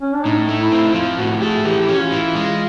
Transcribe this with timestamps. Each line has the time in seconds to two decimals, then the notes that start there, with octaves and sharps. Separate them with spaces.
0.01 C#4
0.13 D4
0.25 A2 D#4
0.49 A3
0.61 E4
0.72 C4
0.95 F3 F4
1.18 A2 F#4
1.42 A3 G#4
1.65 E3 G4
1.89 C#4
2.00 F4
2.12 E3
2.35 G#3